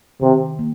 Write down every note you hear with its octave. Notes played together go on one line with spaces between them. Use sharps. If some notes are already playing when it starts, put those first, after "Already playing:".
C3 D#3
A#3